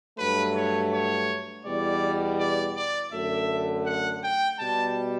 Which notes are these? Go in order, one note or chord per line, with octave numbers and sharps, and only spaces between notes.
G2 F#3 A3 B4
C#5
C#5
E2 B2 G3 D5
D5
D5
F#2 D3 A3 E5
F#5
G5
B2 G3 A5